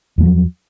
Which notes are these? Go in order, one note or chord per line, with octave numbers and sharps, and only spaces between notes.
E2 F3 F#3 A3